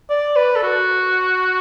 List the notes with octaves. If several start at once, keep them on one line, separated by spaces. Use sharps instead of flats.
D5
B4
A4
F#4